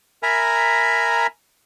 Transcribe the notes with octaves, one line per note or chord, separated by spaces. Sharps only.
A#4 E5 G#5 A#5 B5